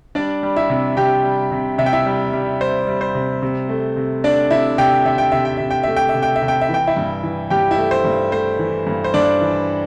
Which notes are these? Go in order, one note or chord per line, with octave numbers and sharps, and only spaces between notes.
G3 D4 D5
G3
E4 E5
C3
C3 G4 G5
G3
C3
C3 E5
G5
E4 E5
G3
G3
G3 C5
G3
C5
C3
C3
A3
C3
A3 D4 D5
C3 E4 E5
C3 G4 G5
C3 E5
G5
C3 E5
G5
C3 E5
G5
A3 E5
G5
E5
C3
G5
E5
C3
G5
E5
E3 G5
E4 E5
G2
E3
G2 G4 G5
E4 E5
A3
C5
G2
A3 C5
E3
G2
C5
G2 D4 D5
E3